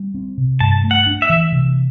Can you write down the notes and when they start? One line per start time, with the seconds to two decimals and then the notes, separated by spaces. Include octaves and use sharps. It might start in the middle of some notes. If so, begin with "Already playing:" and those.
Already playing: G3
0.14 C4
0.38 C3
0.60 G2 A5
0.84 A3
0.91 F#5
1.06 D4
1.22 E5
1.30 E3
1.52 C3